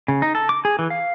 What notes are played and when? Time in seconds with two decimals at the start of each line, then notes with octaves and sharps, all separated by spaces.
0.08 C#3
0.22 D#4
0.35 A4
0.49 D6
0.65 G#4
0.79 E3
0.90 F5